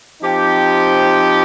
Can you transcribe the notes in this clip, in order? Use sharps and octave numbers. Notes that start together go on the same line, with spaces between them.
F3 C4 D#4 G4